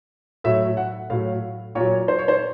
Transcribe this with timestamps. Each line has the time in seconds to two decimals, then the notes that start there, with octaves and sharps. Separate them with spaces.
0.44 A2 F#3 E5
0.77 F#5
1.10 A2 F#3 F5
1.75 A#2 F#3 C#5
2.08 C5
2.19 C#5
2.28 C5